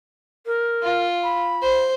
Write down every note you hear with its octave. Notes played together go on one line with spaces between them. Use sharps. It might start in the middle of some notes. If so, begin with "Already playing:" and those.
A#4
F4
B5
C5